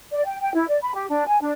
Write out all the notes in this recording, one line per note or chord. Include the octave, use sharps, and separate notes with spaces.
D5
G5
G5
E4
D5
B5
G4
D4
G#5
D4